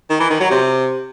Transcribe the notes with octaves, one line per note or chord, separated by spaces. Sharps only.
D#3
E3
D#3
F#3
C3